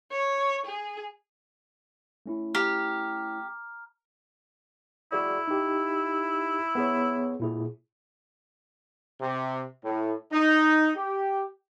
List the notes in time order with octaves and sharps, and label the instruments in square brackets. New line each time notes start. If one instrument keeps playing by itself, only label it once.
[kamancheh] C#5
G#4
[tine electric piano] A3 C#4 E4
[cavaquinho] G4 [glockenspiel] A#5 F6
[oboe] E4 [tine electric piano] F#4 G#4 D5
[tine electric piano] D#4 G4
B3 G#4 C#5
A#2 E4 G#4
[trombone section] C3
A2
D#4
G4